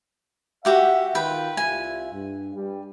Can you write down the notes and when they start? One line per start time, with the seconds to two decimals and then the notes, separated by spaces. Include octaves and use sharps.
0.65 F#4 G4 E5 F#5
1.15 D#3 F4 B4 G5
1.57 C2 F4 E5 G#5
2.13 G2
2.55 G2 G3